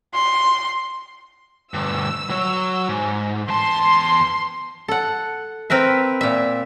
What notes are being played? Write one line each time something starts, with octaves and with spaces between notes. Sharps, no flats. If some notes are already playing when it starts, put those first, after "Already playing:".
C6
D2 G2 E6
F#3 C#5
G#2
E2 A5 C6
A4 F#5
C4 A#4 B4 E5
A#2 E5